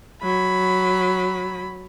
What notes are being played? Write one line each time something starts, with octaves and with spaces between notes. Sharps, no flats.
F#3 B5